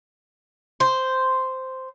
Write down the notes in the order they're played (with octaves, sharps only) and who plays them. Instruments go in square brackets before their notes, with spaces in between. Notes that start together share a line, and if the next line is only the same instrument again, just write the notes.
[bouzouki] C5